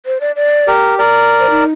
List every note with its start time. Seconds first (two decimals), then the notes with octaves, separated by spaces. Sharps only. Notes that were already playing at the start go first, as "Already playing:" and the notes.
0.06 C5
0.21 D5
0.36 D5
0.67 G4 A#4
0.99 A#4 D5
1.40 C5
1.50 D#4